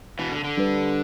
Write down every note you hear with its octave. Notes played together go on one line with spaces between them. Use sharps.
B2 E3
D3
D3
G3 D4 B4